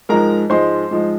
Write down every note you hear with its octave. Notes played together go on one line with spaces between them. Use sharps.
G#2 F3 G#3 A#4 A#5
G#2 F3 G#3 C5 C6
G#2 F3 G#3